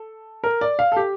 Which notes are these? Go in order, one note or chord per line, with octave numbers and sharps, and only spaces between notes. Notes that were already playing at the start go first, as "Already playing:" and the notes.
Already playing: A4
A#4
D5
F5
A4
G4